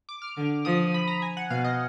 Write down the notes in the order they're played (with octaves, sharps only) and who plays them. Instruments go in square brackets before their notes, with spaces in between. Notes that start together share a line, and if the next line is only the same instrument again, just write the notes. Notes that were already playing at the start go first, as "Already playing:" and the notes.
[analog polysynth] D6
F6
[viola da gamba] D3
[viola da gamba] F3 [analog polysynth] D#6
[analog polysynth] B5
A#5
G#5
F#5
[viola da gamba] B2 [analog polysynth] F5
[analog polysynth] D#5